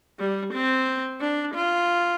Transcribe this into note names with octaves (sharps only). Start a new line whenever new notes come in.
G3
C4
D4
F4